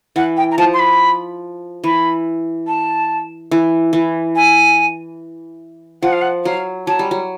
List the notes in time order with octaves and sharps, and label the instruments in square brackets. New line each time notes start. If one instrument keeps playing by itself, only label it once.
[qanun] E3 [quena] F#5
[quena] G5
A#5
[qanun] F3 [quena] A5
[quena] C6
B5
[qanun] E3 [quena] B5
[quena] A5
[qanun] E3
E3
[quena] G#5
[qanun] F3 [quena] F#5
[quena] F5
F#5
[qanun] F#3 [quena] F5
[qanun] F#3 [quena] A5
[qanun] G3
F#3